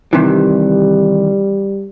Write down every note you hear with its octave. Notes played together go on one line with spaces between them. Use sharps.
C3 D#3 E3 G3